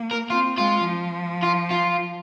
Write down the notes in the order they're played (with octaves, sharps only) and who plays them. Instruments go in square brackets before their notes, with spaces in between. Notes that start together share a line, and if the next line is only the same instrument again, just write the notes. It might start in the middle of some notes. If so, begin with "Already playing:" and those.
Already playing: [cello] A#3
[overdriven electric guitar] A#4
[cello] C4 [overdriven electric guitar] F4
[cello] G#3 [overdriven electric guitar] F4
[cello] F3
[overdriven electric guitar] F4
F4